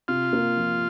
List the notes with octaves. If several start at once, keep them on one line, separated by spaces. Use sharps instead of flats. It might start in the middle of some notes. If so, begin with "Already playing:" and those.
C3 F4
A#3
F3